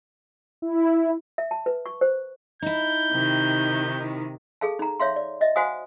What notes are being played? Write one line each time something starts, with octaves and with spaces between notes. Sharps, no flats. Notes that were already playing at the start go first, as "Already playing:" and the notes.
E4
E5
A5
B4
C#6
C5
D#4 E4 G6
C3 D#3
G#4 A4 F5 A5
D#4 A#5
C#5 E5 F5 C6
D5
D#5 E5
F#4 C5 F5 F#5 G#5 D#6